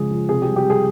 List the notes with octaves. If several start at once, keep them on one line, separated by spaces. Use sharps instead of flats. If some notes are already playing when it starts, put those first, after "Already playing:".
Already playing: C#3 F3 G#3 G#4
F3
C3 G#4
G4
G3
G4
G3 G#4